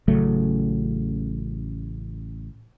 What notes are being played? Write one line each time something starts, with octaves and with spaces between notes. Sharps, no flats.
A1 C#3 F#3 A3